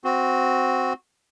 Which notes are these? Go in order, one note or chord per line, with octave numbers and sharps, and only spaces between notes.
C4 F#4